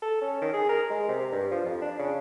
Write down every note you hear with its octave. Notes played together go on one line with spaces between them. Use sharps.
A4
C#4
D#3
G#4
A#4
G#3
C3
G2
F3
F2
D4
C#3